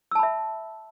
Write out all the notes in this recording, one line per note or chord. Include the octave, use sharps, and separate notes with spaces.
E5 A5 B5 E6